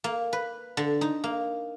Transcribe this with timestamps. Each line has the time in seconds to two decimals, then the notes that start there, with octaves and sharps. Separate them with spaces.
0.04 A#3
0.33 B4
0.77 D3
1.01 D#4
1.24 A#3